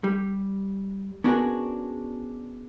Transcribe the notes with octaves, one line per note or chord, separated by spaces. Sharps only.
G3
B3 C#4 D4 F#4 G#4 A#4